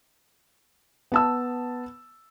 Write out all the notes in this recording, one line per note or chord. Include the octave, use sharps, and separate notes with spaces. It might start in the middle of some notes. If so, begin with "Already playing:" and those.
B3 A5 E6